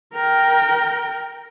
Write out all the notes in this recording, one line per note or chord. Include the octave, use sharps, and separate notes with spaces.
A#4 G5